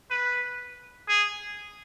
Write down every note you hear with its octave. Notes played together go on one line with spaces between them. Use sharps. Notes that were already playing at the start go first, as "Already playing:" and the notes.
B4
G#4